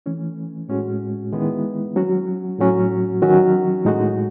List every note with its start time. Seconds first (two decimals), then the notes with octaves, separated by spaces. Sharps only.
0.06 E3 A3 C#4
0.68 A2 G#3 C#4 F#4
1.33 D#3 G#3 B3 E4
1.96 F#3 C#4 F#4
2.59 A2 F#3 C#4 F#4
3.22 D#3 F#3 C#4 F#4
3.85 A2 G#3 D#4 F#4